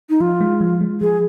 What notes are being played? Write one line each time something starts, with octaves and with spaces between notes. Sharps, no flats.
D#4
F3 F4
G#3
F3
G#3
F3 G#4